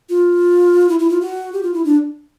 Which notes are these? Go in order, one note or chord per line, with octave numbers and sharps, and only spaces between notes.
F4
E4
E4
F4
F#4
G4
F4
E4
D4